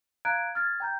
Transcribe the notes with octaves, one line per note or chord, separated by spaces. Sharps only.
F5 A#5 F#6 G#6 D7
F6 G#6 A6
G5 A#5 G6